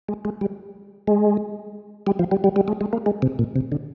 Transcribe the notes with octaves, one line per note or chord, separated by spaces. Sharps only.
G#3
G#3
G3
G#3
G3
F3
G3
G3
G3
G#3
G#3
A#3
G#3
C3
A#2
C3
D3